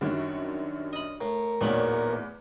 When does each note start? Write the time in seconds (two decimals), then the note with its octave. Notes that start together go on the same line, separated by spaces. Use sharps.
0.01 F#2 D#3 G3 D4 F#4 C#5
0.93 D#5 B5
1.21 A2 A#4
1.61 A1 E2 A#2 D#3 F#3 E4 C#5 D5